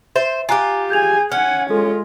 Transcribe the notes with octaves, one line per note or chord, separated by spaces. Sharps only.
C5 E5
F4 G4 G#5 A#5 F#6
G#4 G#5 G6 G#6 F7
C#4 F#5 G#5 F6
G#3 F4 A4